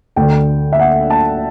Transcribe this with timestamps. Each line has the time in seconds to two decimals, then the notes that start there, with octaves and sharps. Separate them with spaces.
0.16 D2 D3 G5
0.73 E5
0.79 F#5
1.10 A5